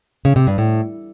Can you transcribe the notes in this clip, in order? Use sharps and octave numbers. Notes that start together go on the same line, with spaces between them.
C#3
C3
G2
A2